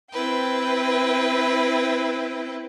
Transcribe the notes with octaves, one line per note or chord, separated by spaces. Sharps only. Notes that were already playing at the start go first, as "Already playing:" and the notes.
C4 E4 B4 G5